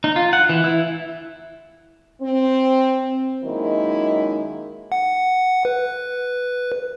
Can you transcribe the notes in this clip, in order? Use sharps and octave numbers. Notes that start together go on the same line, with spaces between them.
D#4
F4
F#5
E3
E4
C4
F#2 D#3 G#3 A#3 D#4 E4
F#5
B4